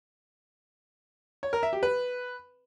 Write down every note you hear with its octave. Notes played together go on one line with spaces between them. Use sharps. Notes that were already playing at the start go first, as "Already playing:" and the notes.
C#5
A#4
E5
G4
B4